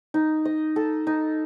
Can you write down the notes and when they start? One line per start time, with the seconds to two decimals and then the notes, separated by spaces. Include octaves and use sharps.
0.14 D#4
0.45 D#5
0.76 A4
1.07 D#4